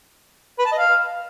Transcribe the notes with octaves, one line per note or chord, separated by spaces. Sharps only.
B4
A5
D#5
F5